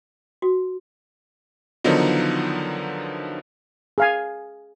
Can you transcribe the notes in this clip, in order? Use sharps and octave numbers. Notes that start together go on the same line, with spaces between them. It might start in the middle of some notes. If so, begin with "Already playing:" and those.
F#4
D3 D#3 F3 F#3 B3 D#4
G#4 F5 G#5